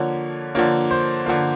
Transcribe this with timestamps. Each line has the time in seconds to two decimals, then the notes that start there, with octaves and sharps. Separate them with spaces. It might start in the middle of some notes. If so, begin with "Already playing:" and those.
Already playing: D3 F3 A#3 C#5
0.55 D3 F3 A#3 C#5
0.91 C5
1.26 D3 F3 A#3